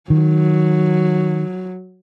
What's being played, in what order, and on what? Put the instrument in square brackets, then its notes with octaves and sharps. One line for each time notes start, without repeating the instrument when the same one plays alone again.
[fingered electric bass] D#3 [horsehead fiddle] F#3